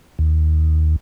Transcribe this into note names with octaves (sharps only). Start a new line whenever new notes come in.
D#2